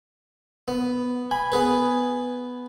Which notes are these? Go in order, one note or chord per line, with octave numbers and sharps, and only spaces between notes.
B3
G#5 B5
B3 G#4 B4